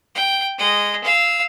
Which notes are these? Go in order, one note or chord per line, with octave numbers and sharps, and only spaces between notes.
G5
G#3 D#5
F5 E6